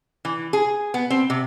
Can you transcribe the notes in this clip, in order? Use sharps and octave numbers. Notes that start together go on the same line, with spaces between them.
E3
G#4
B3
C4
C3